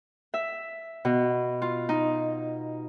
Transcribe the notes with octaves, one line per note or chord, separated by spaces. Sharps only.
E5
B2
F4
D#4